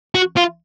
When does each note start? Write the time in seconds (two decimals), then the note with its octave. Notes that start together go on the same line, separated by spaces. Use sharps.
0.15 F#4
0.37 F4